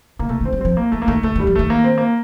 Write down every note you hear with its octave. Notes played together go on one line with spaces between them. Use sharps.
D3 A#3
C3 A3
D#3
C4
G3
F3 C4
A#3
F3 A3
A#3
D#3 A3
D3 A3
D#3
G3
F3
D#3 A3
A#3
C4
A#3